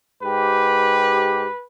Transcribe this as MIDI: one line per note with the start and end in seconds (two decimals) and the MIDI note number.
0.22 1.46 44
0.22 1.46 67
0.22 1.64 71